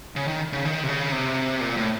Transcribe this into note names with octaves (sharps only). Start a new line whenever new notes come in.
C#3
D#3
C#3
D#3
C3
C#3
C3
A#2
A2